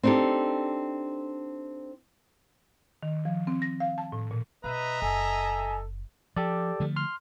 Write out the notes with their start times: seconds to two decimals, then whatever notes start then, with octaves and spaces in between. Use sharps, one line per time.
0.03 C4 D4 D#4 G4 A4
3.03 D#3
3.25 F3
3.47 C4
3.62 A#6
3.80 F5
3.98 A5
4.12 A2
4.31 A#2
4.64 B2 B4 D#5 E5 A#5
5.02 F#1 A4 G#5
6.36 F3 G4 A4 D5
6.80 D3 F3 A3
6.96 C6 F6